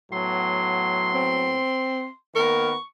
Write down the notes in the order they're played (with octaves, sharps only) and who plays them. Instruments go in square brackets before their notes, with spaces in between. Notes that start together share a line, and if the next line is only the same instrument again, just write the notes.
[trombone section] A2 F#3 B3 [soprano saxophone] C6
[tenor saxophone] C4
[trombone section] D#3 A#3 B3 [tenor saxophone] A#4 [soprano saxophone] C#6